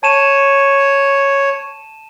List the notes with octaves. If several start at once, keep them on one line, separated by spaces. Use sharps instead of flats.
C#5 A5 D#7 E7